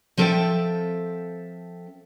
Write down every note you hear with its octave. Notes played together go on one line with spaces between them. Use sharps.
F3 C4 A4 E5 G5